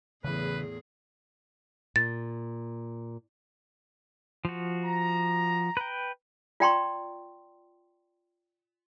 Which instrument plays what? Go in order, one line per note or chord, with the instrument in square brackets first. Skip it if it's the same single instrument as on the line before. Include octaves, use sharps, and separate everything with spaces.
[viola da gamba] E2 A2 G#4 [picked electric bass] C#3 E3 [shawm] B4
[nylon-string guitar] A#2 [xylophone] A6
[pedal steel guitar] F3 F#4
[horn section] A#5
[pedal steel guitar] B4 G5
[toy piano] F4 D5 G5 A#5 C6 C#6